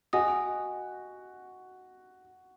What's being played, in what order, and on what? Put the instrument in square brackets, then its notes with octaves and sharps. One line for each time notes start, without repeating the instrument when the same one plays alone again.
[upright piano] F#4 [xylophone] D#5 G#5 D#6